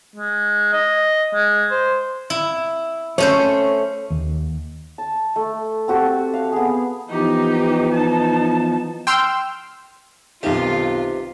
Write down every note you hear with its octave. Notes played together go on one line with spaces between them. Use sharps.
G#3
D#5
G#3
C5
E4
A3 C#4 C5 C#5
D#2
A5
A3
C4 F#4 G4 A4
F5
B3 G#4
E3 F3 B3 D#4 G4
D#4 A5
G5 C6 E6 F6
B1 C3 D#3 F4